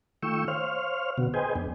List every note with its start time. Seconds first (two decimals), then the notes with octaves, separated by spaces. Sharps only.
0.23 D#3 A3 F4 G5 C#6 E6
0.48 C5 C#5 F5 F6
1.18 B2 D3 B3 F#4
1.34 G#4 B4 C5 D#5 G5 G#5
1.55 F2 B3 D4